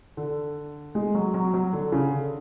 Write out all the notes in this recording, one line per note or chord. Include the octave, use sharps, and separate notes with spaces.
D3
G#3
F#3
F#3
F#3
D3
C#3
D3